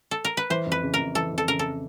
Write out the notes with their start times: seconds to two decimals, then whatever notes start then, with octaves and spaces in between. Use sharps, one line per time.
0.11 A4
0.25 A#4
0.37 B4
0.50 E3 C5
0.66 F2
0.72 B4
0.82 C#3
0.94 A#4
0.99 F2
1.15 E3 A4
1.32 F2
1.38 A4
1.48 C#3 A#4
1.59 A4